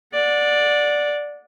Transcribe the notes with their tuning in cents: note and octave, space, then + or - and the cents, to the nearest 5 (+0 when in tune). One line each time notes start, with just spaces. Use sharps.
D5 +0 F#5 -25